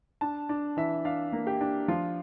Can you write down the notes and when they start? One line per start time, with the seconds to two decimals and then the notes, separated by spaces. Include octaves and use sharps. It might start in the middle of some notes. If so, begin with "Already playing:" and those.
0.21 D4 A5
0.49 D4
0.77 E3 E5
1.05 D4 F5
1.33 A#3
1.47 G4
1.61 D4
1.88 F3 F4